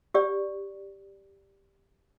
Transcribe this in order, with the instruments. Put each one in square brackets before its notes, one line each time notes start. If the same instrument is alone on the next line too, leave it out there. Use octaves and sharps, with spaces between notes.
[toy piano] G4 D5